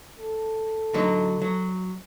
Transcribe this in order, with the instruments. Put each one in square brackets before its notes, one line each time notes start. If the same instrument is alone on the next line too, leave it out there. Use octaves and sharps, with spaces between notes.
[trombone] A4
[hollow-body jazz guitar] D3 F#3 D#4
F#3